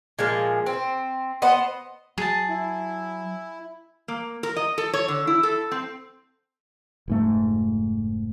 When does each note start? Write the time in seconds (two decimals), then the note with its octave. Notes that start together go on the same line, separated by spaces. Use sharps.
0.19 A#2 F3 G#3
0.66 C4
1.42 B3 C5 D#5 F#5
2.18 F#3 G#4 A5
2.49 E4
4.08 A#3
4.43 A#4
4.56 D#5
4.78 A4
4.94 C#5
5.08 D3
5.27 E4
5.43 A4
5.72 C4
7.08 F1 G#2 A3